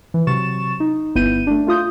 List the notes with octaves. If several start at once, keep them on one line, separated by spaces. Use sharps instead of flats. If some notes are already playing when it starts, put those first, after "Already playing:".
E3
C3 F#3 C#6 A6 E7
D#4
G1 B3 E4 G6 D#7
A3 D4
A3 F4 D#6 G6